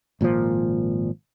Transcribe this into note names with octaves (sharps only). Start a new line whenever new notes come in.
G#1 A#2 D3 F3